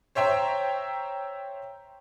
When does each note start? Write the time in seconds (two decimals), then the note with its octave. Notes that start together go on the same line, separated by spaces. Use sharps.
0.15 C5 C#5 E5 G5 A#5